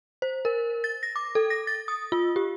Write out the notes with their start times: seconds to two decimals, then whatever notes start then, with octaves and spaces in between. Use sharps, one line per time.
0.22 C5
0.45 A#4
0.84 A6
1.03 A#6
1.16 D6
1.35 A4
1.50 A#6
1.67 A6
1.88 D#6
2.12 F4
2.36 G4